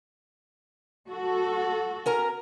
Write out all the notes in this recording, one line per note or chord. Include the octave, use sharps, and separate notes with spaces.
F#4 A4
C#4 A#4 A#5